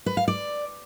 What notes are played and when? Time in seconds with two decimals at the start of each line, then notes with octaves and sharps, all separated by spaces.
0.06 B4
0.17 F5
0.28 D5